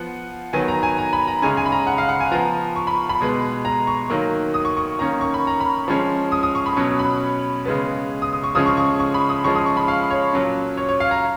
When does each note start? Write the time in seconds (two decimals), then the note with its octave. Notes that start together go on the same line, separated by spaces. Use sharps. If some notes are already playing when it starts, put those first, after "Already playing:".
Already playing: F3 B3 F#5
0.53 D#3 F#3 B3 G#5
0.68 A#5
0.83 G#5
0.98 A#5
1.13 B5
1.27 A#5
1.42 C#3 G#3 C#4 G#5
1.57 G#5
1.66 B5
1.72 A#5
1.87 F#5
1.98 F5
2.09 F#5
2.20 G#5
2.32 F3 B3 A#5
2.76 C#6
2.87 B5
3.09 B5
3.21 B2 G#3 B3
3.65 A#5
3.87 C#6
4.10 D#3 F#3 A#3
4.54 D#6
4.65 C#6
4.77 C#6
4.99 D#3 A#3 C#4 A#5
5.21 C#6
5.34 B5
5.47 A#5
5.60 B5
5.88 F3 G#3 C#4
6.32 D#6
6.43 D#6
6.55 C#6
6.66 B5
6.77 B2 F#3 C#4
6.99 B5
7.65 C#3 G#3 B3
8.22 D#6
8.33 D#6
8.44 C#6
8.55 C#3 F3 G#3 C#4 D#6
8.66 C#6
8.77 C#6
9.00 C#6
9.14 B5
9.29 D#6
9.44 F3 G#3 C#4 C#6
9.55 D#6
9.66 C#6
9.77 B5
9.88 F5
10.11 C#5
10.33 A#2 F#3 C#4
10.77 C#5
10.89 C#5
11.00 F5
11.11 A#5